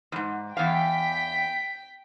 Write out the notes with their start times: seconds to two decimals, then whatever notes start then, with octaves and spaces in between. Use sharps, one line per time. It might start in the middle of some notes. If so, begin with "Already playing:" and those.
0.12 E2 G#2
0.57 E2 F5 G5 B6